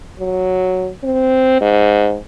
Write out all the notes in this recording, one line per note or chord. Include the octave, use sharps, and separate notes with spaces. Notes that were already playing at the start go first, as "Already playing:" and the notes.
F#3
C4
G#2